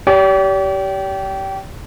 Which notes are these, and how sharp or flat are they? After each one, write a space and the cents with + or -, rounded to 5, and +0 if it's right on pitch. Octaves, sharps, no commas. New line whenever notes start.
G4 -20 D5 -45